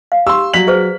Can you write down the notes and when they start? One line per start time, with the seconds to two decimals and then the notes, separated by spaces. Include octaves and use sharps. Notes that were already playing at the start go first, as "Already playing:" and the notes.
0.12 F5
0.27 G4 C6 E6
0.54 F#3 D5 B6 F#7
0.67 G#4 B4 C5